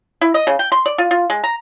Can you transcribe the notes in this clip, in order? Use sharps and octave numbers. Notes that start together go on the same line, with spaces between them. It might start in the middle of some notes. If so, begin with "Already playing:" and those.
E4
D#5
C#3
G5
C6
D5
F4
F4
G#3
A#5